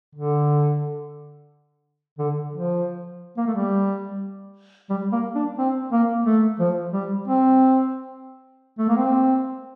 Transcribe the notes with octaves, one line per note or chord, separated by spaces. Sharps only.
D3
D3
F3
A#3
A3
G3
G3
A#3
D4
C4
A#3
A3
F3
G3
C4
A3
A#3
C4